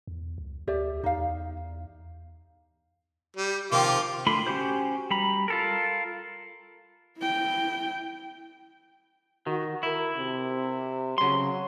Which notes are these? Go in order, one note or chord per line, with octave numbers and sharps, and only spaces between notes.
E2
C#2
D2 G4 D5 E5
E2 D#4 F5
G3
C3 D#3 F3 F4 D6
D3 A3 F4 B5 C6
C#4 F#4 G4 C5
G3 A#5 B5
F4 A4 A#4
E4 G5
D#3 F#4
E4 A#4
C3
C#3 F#3 C6